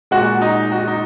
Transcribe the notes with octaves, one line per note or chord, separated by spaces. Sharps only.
A#2 G#3 F#4
D#4
F#4
D#4